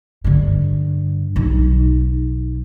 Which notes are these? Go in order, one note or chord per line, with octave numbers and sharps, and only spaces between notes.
G2 D3
B1 D#4